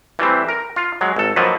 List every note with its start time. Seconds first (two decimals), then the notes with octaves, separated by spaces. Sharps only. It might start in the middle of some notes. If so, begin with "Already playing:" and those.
0.19 E3 G3 A3 C4
0.49 A#4
0.76 F4
1.01 F#3 G#3
1.16 G#1 A4
1.36 D#3 F3 F#3 A#3 A4 B4